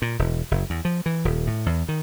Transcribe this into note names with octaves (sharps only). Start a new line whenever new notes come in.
A#2
E1
F#1
E2
F3
E3
D#1
A2
E2
D#3